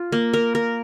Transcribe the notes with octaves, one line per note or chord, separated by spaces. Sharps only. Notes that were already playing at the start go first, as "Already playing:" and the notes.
Already playing: F4
A#3
A#4
A#4